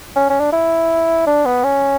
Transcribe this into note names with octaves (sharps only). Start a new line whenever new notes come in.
C#4
C#4
D4
E4
D4
B3
C#4